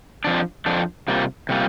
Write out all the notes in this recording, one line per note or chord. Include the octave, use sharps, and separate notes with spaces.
F2 F3 D4
F2 F3 D4
C3 G3 A#3 F4
C3 G3 A#3 F4